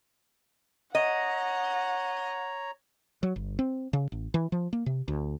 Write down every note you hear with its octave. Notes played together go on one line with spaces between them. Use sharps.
C#5 D#5 F#5 A#5
F#3
G1
C4
C#3
A1
E3
F3
A#3
C3
D2